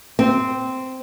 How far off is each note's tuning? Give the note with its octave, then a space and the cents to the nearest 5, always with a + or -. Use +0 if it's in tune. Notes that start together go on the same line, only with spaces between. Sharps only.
C4 -10